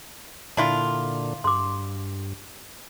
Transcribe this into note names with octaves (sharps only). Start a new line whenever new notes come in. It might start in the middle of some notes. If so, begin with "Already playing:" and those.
A#2 D3 D4 E4 F4
G2 C6 D6